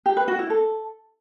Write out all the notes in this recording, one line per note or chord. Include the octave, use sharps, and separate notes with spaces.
G4
B4
F#4
E4
A4